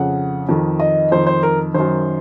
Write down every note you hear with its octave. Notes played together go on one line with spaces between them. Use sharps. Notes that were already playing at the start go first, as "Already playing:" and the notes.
Already playing: F2 C#3 F#5
F2 D#3
D#5
F2 D#3 C5
C5
A#4
F#2 D#3 C5